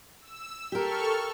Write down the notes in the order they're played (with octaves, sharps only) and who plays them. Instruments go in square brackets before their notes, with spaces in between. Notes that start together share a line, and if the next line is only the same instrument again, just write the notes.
[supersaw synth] E6
[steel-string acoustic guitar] G4 A#4 [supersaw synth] A4 C#6 F6